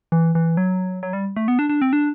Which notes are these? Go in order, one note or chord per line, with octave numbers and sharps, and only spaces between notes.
E3
E3
F#3
F#3
G3
A3
B3
D4
D4
C4
D4